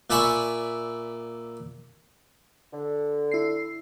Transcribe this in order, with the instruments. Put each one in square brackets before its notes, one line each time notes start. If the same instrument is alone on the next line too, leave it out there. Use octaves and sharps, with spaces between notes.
[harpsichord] A#2 D5 E5 G#5 B5 C#6
[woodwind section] D3
[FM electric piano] E4 C7